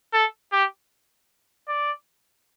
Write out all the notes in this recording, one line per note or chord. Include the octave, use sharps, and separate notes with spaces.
A4
G4
D5